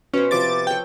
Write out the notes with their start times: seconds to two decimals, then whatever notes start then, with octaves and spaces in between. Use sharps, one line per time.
0.14 B2 C#4 F#4 C5
0.31 C3 F3 B3 D6 A6
0.67 A4 C#5 G5